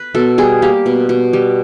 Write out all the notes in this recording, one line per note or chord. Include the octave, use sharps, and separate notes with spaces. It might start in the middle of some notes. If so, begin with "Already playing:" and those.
Already playing: B4
B2 A4
G3 G#4
A#3 G4
B2
B2
G3